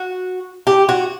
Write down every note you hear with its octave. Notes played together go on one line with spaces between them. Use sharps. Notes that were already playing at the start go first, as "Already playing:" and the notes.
Already playing: F#4
G4
F#4